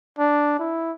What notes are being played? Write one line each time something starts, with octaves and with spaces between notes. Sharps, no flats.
D4
E4